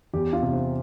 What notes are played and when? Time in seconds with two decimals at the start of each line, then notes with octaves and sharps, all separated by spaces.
0.13 E2 G4
0.33 F4
0.43 C3
0.52 C4